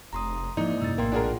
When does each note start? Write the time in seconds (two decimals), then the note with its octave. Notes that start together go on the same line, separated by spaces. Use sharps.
0.13 F1 A#5 C6 D#6
0.57 G#2 E3 F3 A#3 D#4 E4 D5
0.82 F#2 C3 E6 A6
0.98 A#1 A2 A#3 A#4 G5 C6
1.12 D4 F4 G#4 A#4 F#5 A5